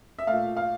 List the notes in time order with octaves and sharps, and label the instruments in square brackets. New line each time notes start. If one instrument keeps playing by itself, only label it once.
[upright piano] E5
A#2 A3 F5
F5